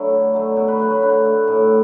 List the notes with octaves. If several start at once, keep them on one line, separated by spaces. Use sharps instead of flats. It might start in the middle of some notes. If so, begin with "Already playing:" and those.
Already playing: F#3 A3 D4 E4
D3
F#3 A3
B2 F#4
B4
F#3 A3
B4
D3 B4
A3
A2